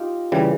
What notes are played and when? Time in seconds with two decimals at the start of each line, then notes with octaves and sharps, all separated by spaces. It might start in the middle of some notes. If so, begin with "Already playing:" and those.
Already playing: D#4 F4 G4
0.32 C#3 E3 G3